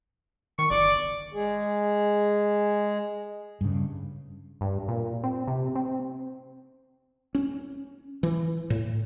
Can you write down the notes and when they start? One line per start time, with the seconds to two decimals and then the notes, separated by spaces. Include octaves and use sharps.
0.59 D#3 C#6
0.71 G1 D5
1.34 G#3 G#4
3.61 G2 C#3
4.61 G2
4.88 A#2
5.24 C4
5.48 C3
5.75 C4
7.35 C#4
8.23 E3
8.70 A2